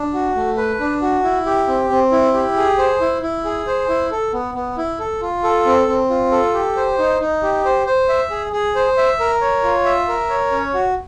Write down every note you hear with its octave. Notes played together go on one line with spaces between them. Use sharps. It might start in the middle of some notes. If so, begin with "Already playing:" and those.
Already playing: D4
F#4
A3
B4
D4
F#4
E4
G4
C4
C4
E4
G4
G#4
C5
E4
E4
G#4
C5
E4
A4
B3
B3
E4
A4
F4
A4
C4
C4
F4
A4
G4
C5
D#4
D#4
G4
C5
C5
E5
G#4
G#4
C5
E5
A#4
C#5
F4
E5
A#4
C#5
C#4
F#4